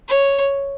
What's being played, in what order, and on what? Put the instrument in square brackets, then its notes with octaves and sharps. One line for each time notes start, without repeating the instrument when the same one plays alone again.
[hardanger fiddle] C#5